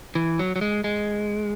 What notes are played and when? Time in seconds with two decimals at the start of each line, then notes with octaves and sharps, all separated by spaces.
0.15 E3
0.39 F#3
0.56 F#3
0.61 G#3
0.84 G#3